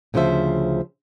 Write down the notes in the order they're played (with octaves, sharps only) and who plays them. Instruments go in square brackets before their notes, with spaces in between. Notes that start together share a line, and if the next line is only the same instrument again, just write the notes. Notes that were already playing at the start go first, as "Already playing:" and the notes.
[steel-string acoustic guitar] D2 C#3 F3 C5 E5